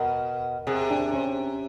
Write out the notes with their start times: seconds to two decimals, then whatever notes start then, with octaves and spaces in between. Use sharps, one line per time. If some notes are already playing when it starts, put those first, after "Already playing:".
Already playing: B2 A#4
0.67 C3 G#4
0.91 D4
1.14 C#4